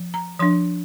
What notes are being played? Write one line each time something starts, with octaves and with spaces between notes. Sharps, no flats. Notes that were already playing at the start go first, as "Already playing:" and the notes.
Already playing: F3
A#5
F3 D4 C6